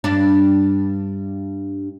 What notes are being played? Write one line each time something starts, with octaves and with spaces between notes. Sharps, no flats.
G2 D4